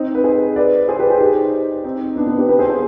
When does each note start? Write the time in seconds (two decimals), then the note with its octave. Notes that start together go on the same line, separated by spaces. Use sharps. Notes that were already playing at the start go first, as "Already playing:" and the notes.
Already playing: C4 D#4
0.15 B4
0.24 G#4 C5
0.56 B4 D5
0.88 G#4 C5
0.99 G4 B4
1.10 G#4 C5
1.21 D#4 G4
1.84 C4 D#4
2.16 B3 D4
2.27 B3 D4
2.38 G4 B4
2.49 G4 B4
2.59 G#4 C5
2.69 G#4 C5